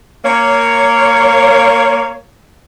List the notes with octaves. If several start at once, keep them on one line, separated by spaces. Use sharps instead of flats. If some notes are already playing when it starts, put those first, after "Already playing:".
A#3 C#5